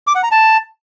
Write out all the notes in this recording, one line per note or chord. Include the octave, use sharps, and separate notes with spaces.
D6
F#5
A#5
A5